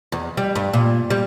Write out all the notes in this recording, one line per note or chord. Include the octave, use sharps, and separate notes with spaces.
E2
G3
G2
A#2
G3